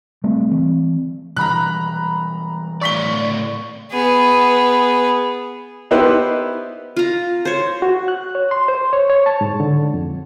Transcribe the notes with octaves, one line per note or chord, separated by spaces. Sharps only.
G3 A3 C4
E3 C4
B2 E3 G3 A#5 B5 F#6
A2 D5 C#6 B6 G7
B3 G#4
B3 D#4 E4 G4 B4 C5
F4 A#5
C5 C#5
F#4
F#6
C#5
C6
C5
C#5
C#5
A5
G#2
D3
F2